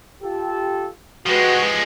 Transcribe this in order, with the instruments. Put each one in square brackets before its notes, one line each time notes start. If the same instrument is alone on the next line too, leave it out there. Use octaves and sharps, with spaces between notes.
[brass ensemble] F4 G4 A4
[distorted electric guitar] F3 G#3 [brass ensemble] F#4 [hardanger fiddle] G4 B4